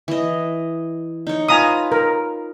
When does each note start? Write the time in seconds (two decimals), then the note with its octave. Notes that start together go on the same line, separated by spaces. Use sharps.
0.08 E3 D#5
1.27 D#4 C#5
1.48 F4 B4 F5 G#5 A#5 D#6
1.92 A#4